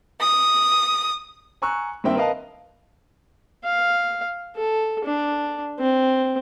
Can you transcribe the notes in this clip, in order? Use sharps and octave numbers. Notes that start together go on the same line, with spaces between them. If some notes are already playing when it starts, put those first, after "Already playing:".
D#6
G#5 A#5 C#6 E6 F#6
G2 D#3 A#3 C4 E5 G5
A#4 B4 D#5 F5 A5
F5
A4
D4
C4